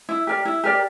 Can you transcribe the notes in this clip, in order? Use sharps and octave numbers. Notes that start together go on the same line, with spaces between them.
E4
G4 A#4 D5
E4
G4 A#4 D5